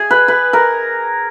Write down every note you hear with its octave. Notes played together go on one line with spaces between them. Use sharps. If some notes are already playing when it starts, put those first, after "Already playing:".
Already playing: G#4
B4
B4
A#4